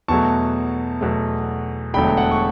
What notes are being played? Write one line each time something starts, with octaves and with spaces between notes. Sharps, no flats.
E2 B2 F#3 A3 A5 C#6
E2 B2 F#3 A3
E1 E2 D3 F#3 A3 G5 B5
F#5 A5
C#6